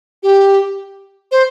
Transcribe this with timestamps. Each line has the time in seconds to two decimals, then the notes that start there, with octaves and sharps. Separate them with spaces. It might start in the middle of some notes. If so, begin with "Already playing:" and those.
0.23 G4
1.32 C5